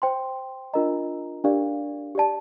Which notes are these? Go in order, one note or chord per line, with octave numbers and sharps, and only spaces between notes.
C5 G5 C6
D4 F4 A#4 D#5 A#5
D4 G4 A#4 D5 F5
G4 D5 A5